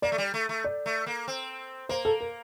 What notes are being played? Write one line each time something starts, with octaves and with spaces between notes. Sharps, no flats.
A#3 D5
A3
G3
A3
A3
D5
A3
A#3
C4
A#3 C5
A4
A#4